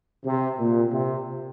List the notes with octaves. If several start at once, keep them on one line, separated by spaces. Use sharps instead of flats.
C3
A#2
C3